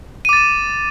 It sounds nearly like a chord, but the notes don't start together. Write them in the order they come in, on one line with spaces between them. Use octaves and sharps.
D#7 D6 A6 E7